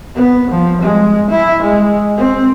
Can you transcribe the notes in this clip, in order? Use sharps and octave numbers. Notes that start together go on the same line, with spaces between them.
B3
F3
G#3
E4
G#3
C4